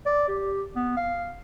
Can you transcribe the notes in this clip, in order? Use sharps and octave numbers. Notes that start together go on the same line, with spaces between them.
D5
G4
B3
F5